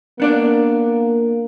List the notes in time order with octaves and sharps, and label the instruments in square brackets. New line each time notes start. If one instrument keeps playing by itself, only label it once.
[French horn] A#3 [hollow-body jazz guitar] B3 D4 D5